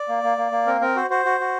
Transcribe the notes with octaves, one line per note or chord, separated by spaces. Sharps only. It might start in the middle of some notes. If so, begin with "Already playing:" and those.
Already playing: D5
A#3
A#3
A#3
A#3
C4 A#4
C4 A#4
F#4 C5
F#4 C5
F#4
F#4